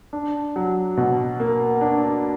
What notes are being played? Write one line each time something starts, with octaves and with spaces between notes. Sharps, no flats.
D4
F#3
B2
A#3
D4